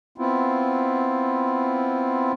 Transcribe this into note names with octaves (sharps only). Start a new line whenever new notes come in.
B3 C4 E4 F4